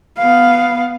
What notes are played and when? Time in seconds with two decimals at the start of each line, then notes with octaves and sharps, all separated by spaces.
0.18 B3 F5